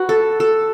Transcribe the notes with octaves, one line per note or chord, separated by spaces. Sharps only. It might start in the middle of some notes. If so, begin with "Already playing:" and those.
Already playing: F#4 B4
A4
A4